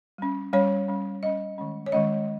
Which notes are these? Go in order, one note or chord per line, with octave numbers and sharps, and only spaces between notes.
G3 C#4
G3 C#4 C#5
G3 C#4
G3 C#4 D#5
D#3 G#3 C#4
C#5
D#3 G#3 C#4 D#5